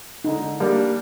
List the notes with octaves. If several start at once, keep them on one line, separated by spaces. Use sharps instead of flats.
D3 D#4
G3 A#3 D4